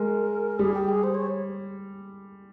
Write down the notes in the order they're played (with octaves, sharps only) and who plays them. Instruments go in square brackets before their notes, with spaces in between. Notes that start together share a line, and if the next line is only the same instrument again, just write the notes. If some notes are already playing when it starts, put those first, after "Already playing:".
Already playing: [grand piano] G#3 [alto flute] A#4
[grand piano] G3 [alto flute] G#4
[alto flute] G4
G#4
C5
C#5